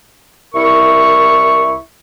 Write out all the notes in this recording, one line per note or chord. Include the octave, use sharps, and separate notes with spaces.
C2 E4 A#4 C#6